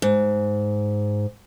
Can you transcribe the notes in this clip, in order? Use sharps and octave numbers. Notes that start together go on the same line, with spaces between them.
G#2